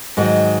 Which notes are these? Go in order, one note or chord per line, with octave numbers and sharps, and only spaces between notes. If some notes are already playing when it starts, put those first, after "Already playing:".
G#2 D#3 F#3 G#3